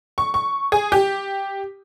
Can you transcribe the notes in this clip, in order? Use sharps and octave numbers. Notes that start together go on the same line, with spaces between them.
C#6
C#6
G#4
G4